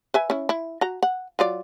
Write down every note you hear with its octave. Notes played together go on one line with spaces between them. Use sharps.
B4 E5 G#5
C#4 E4
E4
F#4 A#5
F#5
F#3 F4 D5